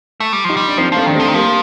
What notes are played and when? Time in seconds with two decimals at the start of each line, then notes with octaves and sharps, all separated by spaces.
0.20 A3
0.33 G3
0.44 F3 D#4 G4
0.57 G3
0.68 D4
0.77 F3 C4 D#4
0.92 F3 A3 C4
1.06 D#3 D4
1.15 F3 A3 C4
1.28 D#3
1.34 F3 G3 A#3